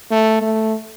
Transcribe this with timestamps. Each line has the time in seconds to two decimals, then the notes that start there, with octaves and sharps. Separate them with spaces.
0.11 A3
0.42 A3